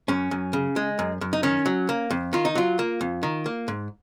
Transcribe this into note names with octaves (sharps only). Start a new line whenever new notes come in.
F#2 C#4
F#2
C#3
G#3
F#2
F#2
D#4
D#3 C#4
F#3
A#3
F2
D#3 F4
D#4
F#3 F4
A#3
F2
D#3
A#3
G#2